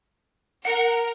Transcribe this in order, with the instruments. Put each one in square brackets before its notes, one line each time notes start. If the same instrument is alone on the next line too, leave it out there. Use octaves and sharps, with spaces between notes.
[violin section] A#4 [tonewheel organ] F#5